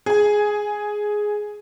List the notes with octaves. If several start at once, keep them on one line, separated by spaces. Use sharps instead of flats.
G#4 G#5